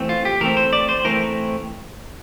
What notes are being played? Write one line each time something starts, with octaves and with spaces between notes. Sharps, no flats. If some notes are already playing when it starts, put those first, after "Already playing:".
Already playing: E3 A3 C4
F4
G4
E3 A3 C4 A#4
C5
D5
C5
E3 A3 C4 A#4